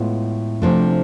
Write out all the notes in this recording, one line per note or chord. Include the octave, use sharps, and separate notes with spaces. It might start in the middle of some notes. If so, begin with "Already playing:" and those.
Already playing: A2 G#3 B3 F4
C3 F3 A3 D4